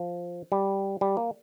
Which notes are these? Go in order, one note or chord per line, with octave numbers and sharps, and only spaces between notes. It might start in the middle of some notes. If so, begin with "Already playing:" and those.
Already playing: F3
G3
G3
A#3